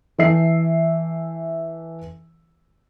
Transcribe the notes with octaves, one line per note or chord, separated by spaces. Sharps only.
E3 A4 E5 C7